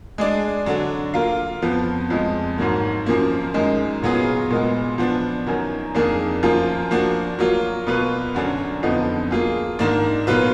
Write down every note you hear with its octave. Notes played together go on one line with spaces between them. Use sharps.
G#3 D4 G#4 D5
D3 F#3 D4
A#3 F4 A#4 F5
F2 F3 B3
F2 F3 G#3
G#2 D#3 F#3 A#3
F#2 F3 A#3
F#2 D#3 G#3
A#2 F#3 B3 F4 G#4
A#2 G#3 B3
F3 B3 D4
F#2 D#3 F#3
F2 D#3 A#3 D4 G#4
F#2 F3 A#3 F4
F3 A#3 D4 F#4
F#3 A#3 F4
B2 A#3 F4 B4
F#2 D3 F#3 D4 F#4
F2 D3 F3 B3 D#4
A#3 F4 G#4
G#2 D#3 A#3 D4
A#2 F#3 B3 F4 B4